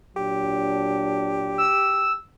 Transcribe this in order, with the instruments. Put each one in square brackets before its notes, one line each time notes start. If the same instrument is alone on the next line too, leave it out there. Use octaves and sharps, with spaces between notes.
[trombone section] A#2 F#3 D4 [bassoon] G4
[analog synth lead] E6